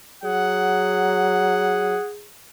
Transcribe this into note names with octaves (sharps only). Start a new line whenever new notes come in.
F#3 G#4 F#5